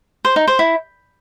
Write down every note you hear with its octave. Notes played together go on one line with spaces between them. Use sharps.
C5
D#4
C5
E4